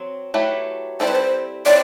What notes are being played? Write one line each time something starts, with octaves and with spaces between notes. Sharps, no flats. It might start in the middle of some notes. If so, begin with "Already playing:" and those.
Already playing: F#3 C4
F#3 A3 E4 G4 B4
G3 C4 E4 A4 C5
B4
C5
F#3 C4 E4 D5